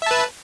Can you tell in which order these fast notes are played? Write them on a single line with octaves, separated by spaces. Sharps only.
E5 A5 B4